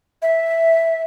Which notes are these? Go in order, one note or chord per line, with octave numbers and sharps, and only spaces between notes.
E5